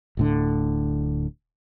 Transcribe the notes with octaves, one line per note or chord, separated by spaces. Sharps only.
D1 A2 D3